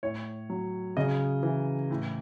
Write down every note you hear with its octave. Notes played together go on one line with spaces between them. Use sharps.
A2 C#5
F#3
C#3 D#5
E3
A2